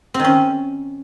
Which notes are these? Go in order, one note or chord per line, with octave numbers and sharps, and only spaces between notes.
C4
D#3
C#4